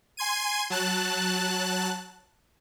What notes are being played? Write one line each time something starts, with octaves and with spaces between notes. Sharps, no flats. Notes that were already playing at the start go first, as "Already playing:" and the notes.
G#5 C6 G#6 D#7
F#3 A5 F#6